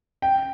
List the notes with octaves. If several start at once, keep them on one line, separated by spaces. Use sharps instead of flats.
G5